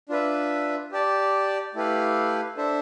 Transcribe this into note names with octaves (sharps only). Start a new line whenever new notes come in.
D4 F4 B4 E5
G4 D5 A5
A3 E4 G4 B4 F5
D4 A4 C5 E5